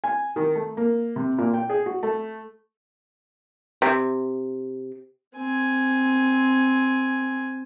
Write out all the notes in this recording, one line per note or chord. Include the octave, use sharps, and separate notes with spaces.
G#5
D#3
A3
A#3
C3
A#2
G5
G#4
F#4
A3
C3
C4 G#5